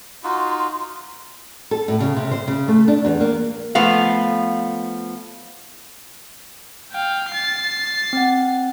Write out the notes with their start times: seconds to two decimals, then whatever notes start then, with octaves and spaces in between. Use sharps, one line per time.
0.24 D#4 F4 F#4 C6
1.71 A4
1.88 A2
2.00 C#3
2.17 C3
2.31 C5
2.48 C#3
2.68 A3
2.88 D4
3.05 E2
3.20 A#3
3.75 F3 A3 B3 F5
6.92 F5 G5
7.30 A6 C7
8.13 C4 F#5